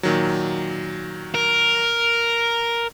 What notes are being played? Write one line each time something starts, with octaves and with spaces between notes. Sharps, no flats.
A#2 D#3 F#3
A#4